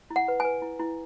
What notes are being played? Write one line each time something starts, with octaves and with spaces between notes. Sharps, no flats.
E4
F#5
B4
B4 G#5
E4
E4